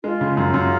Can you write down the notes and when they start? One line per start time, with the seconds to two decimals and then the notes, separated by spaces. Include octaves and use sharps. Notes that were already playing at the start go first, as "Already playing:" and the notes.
0.03 G#3 F4
0.21 C#3
0.37 F#2 F4
0.54 F#2